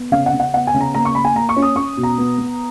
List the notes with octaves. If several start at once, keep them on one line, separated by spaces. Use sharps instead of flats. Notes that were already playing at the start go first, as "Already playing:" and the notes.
Already playing: B3
C#3 F5
F#5
C#3
F#5
B3 F#5
G#5
C#3
A#5
A#3 A#5
C#6
A#3 B5
G#5
A#3 A#5
C#6
C#4
D#6
C#4 C#6
B2
A#5
B3
B3